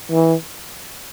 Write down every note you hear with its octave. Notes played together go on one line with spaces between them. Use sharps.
E3